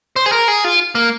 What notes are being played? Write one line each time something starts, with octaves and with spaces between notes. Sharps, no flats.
C5
G#4
A#4
G#4
F4
A#3